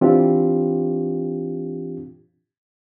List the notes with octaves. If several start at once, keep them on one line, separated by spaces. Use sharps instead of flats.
E3 C4 D4 F4 G4